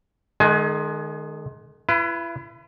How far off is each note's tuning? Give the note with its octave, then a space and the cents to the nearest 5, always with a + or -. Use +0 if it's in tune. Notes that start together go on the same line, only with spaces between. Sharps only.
D#3 -30 G#3 +25 G#5 +25
E4 +40 B4 +0